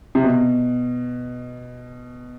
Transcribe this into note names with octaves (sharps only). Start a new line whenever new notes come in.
C3
B2